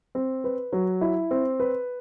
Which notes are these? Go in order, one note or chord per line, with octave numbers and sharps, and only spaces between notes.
C4
B4
F#3
E4
C4
B4